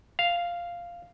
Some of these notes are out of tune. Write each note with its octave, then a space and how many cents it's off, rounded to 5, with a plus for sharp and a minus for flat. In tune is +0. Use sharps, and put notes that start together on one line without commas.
F5 -5